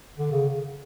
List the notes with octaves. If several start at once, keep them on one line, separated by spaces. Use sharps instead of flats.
D3
C#3